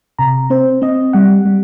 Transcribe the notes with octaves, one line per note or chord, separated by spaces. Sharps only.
C3 A#5
C4 C5
C4 D#5
G3 F#5
G3